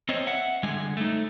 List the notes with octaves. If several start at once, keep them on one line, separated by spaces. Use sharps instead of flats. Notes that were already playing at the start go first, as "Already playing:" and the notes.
C4 C5 C#5 D#5
E5 F#5
D3 G3 G#3 G#5
A3 D#4